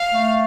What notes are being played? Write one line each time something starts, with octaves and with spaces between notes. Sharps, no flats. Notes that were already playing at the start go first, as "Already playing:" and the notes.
Already playing: F5
A3